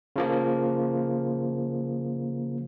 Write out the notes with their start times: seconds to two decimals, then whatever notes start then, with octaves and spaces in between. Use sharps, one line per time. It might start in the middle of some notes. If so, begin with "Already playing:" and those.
0.16 C#3 F3 A#3